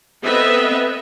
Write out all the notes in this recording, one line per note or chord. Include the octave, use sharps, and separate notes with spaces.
B3 C4 A4 B4 D#5 E5